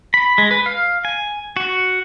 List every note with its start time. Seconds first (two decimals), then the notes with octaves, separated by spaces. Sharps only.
0.14 B5
0.38 G#3
0.51 B4
0.66 F5
1.05 G#5
1.57 F#4